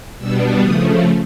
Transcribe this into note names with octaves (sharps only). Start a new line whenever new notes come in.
B2 G3 B3 D4 E6
C#3 F3 A3 D#6